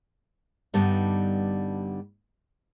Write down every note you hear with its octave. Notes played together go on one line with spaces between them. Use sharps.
G2 D3 G3 B3 D#4